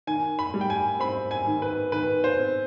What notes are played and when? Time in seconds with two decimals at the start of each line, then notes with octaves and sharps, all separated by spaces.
0.07 D#3 G#5
0.39 B5
0.54 G3
0.61 G5
0.70 G#5
1.00 C4 B5
1.31 G#5
1.47 D#3
1.62 B4
1.92 D#3 B4
2.24 C5
2.39 C4